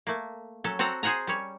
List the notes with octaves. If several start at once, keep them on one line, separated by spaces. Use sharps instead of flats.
A3 A#3
F#3 C#4 A4
C4 F#4 A4 F#5 A#5
G#4 C5 F#5 G#5 A#5
G3 C#4 C#5